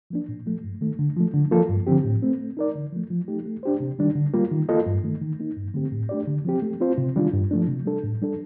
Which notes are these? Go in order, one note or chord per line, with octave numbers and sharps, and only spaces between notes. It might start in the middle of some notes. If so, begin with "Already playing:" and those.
F3 A#3 D4
A#2
F3 A3
G2
D#3 A3
D3
F3 A3
D3
F3 A#3 F4 A4
G2
D3 F3 C4 G4
A2
A3 C4
A3
D#4 A#4 D5
D3
F3 A3
F3
A3 D#4 G4
A3
D4 G4 C5
C3
D#3 G3 D4
D3
G3 A#3 F4
D#3
A#3 F4 A4 D#5
G2
D#3 A3
D#3
A#3 D#4
G2
D3 A3 C4 G4
A2
A3 D4 G4 D5
D3
F3 C4 G4
A3
C4 F4 C5
C3
D#3 G3 D4 F4
G2
F3 A3 D4
C3
G3 D4 A4
A2
G3 D4 A4